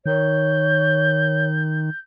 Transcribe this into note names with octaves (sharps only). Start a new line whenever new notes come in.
D#3 C#5 G6